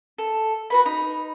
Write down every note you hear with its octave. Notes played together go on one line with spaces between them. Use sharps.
A4
F#4 B4 B5
D#4